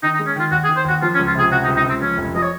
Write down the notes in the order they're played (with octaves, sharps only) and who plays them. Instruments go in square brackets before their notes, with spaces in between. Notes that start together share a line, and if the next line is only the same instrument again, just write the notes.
[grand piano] D#3 [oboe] D#4
[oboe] D#4
[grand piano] G#3
[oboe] C#4
[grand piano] D#3 [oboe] F4
[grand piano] D#2 [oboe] F#4
[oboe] G#4
[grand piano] D#3
[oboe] C5
[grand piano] D#2 [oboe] F#4
[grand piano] F3 [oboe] F4
[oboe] C#4
[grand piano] C#2
[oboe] F4
[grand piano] C3 [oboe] G#4
[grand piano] C3 [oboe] F#4
[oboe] D#4
[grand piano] C#2
[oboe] D#4
[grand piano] C#2 [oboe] C4
[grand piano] F3 [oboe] C#4
[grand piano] F1
[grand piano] F3 [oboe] D#5
[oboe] C#5